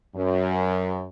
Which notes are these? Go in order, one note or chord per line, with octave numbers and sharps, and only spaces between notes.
F#2